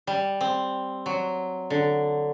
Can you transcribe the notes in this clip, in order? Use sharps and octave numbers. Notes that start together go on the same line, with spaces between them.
G3
C4
F#3
D3